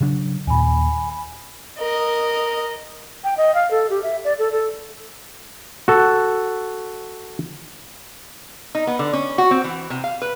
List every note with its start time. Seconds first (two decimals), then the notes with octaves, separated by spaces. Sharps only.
0.01 C#3 F#3 D4
0.47 D#2 A#2 G#5 B5
1.79 A#4 D#5
3.24 G5
3.37 D#5
3.55 F5
3.71 A4
3.90 G4
4.03 E5
4.24 D5
4.39 A4
4.52 A4
5.88 F#4 A4
8.75 D#4
8.87 B3
8.99 D3
9.13 C#4
9.38 F#4
9.51 C4
9.64 E3
9.90 C3
10.04 F5
10.22 B4